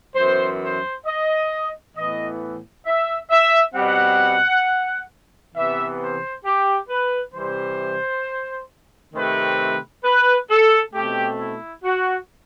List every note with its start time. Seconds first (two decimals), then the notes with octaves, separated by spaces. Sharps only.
0.15 F#2 E3 B3 C5
0.61 C5
1.06 D#5
1.96 A2 E3 B3 D#5
2.86 E5
3.30 E5
3.75 B2 G3 C4 F#5
5.55 C3 E3 B3 E5
6.00 C5
6.45 G4
6.89 B4
7.34 C3 E3 G3 C5
9.14 C3 D#3 A3 C4 B4
10.04 B4
10.49 A4
10.94 B2 A3 C4 G4
11.39 E4
11.84 F#4